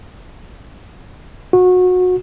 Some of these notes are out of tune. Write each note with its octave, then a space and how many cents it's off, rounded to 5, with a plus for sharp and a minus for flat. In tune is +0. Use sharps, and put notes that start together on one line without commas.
F#4 -25